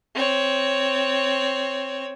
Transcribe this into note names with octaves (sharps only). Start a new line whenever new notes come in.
C4 C#5